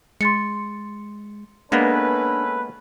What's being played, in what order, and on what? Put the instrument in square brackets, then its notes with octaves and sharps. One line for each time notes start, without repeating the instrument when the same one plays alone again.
[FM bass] G#3 [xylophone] C6 A6 C#7
[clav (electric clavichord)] G#3 A#3 B3 [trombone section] C#4 A4 B4 [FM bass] D4